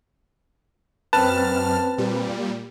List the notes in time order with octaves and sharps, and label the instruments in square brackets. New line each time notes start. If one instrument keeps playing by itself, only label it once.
[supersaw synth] F#2 F6 [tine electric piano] C4 B4 [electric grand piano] A5
[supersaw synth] A#2 G3